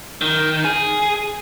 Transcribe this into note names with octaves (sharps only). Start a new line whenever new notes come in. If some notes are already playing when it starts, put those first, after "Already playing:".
D#3
G#4